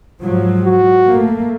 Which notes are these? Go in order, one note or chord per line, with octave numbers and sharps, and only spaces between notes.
G#2 F3 F#3
F#4
A3 A#3